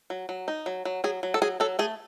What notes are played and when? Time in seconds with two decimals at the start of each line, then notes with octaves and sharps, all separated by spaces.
0.10 F#3
0.29 F#3
0.48 D#4
0.66 F#3
0.85 F#3
1.04 F#3 G#4
1.23 F#3
1.34 A4
1.42 F#3 G#4
1.60 F#3 A4
1.79 A3 G#4